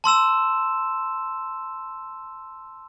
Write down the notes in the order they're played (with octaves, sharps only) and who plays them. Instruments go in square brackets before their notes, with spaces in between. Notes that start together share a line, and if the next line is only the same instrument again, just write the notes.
[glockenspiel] A5 C6 E6 E7